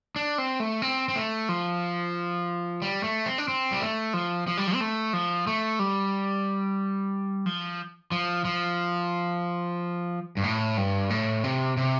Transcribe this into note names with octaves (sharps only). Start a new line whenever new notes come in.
D4
C4
A3
C4
C4
A3
F3
G3
A3
C4
D4
C4
G3
A3
F3
F3
G3
F3
C4
A3
F3
A3
G3
F3
F3
F3
G2
A2
G2
A2
C3
C3